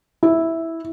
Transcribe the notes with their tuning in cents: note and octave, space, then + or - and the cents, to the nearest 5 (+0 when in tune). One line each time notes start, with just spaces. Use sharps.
E4 -5